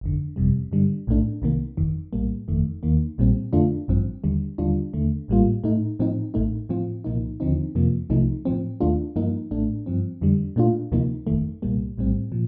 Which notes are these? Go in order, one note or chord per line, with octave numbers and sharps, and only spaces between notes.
G1 F2 D3
G1 F2 C3 G3
G2 D3 G3
A#1 A2 A3 D4
C2 C3 D#3 A#3
G1 F2 D#3
A#1 A2 G3 A#3
G1 F2 D#3 A3
D#2 D#3 A#3
A#1 A#2 G3 C4
F2 D3 A3 D4 F4
A1 G2 F3 C4
D#2 D3 G3
D#2 D3 G3 D4 F4
D#2 D3 A3
A1 A2 G3 A#3 F4
A2 A3 D#4
A2 F3 C4 D#4
A1 A2 A3 D#4
A2 F3 C4 F4
C2 A#2 F3 A#3 D#4
D#2 D3 F3 C4 D#4
F2 C3 F3 A#3
C2 C3 F3 A3 D#4
A2 F3 C4
D#2 D#3 A3 D4 F4
G2 F3 A#3 D#4
A1 A2 A3 D4
G2 F3 C4
F2 D3 G3
A#2 A3 D4 F4
D2 C3 F3 A#3 D#4
G1 F2 D#3 A3
C2 A#2 G3 A#3
A#1 A2 G3 C4
A#2 F3